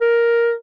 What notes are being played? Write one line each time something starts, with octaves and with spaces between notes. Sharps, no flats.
A#4